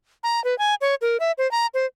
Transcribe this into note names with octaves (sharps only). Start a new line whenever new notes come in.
A#5
B4
G#5
C#5
A#4
E5
C5
A#5
C5